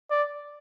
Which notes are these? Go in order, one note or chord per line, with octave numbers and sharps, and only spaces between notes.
D5